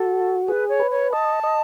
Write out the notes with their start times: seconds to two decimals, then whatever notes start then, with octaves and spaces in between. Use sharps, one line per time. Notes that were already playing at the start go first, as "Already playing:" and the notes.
Already playing: F#4 A4
0.48 G#4 B4
0.69 C#5
0.80 B4
0.91 C#5
1.12 D#5 A5
1.43 D#5